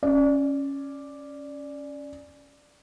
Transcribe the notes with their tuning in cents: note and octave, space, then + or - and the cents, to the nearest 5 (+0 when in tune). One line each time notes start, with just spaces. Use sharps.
C#4 +0 D5 +0